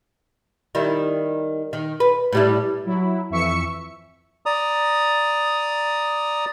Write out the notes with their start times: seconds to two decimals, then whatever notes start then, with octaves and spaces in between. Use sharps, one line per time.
0.75 D#3 G3 E4
1.73 D#3
2.00 B4
2.33 A2 G3 E4
2.85 F#3 E4
3.30 F2 E3 E5 C#6 C#7
4.46 D5 A#5 D#6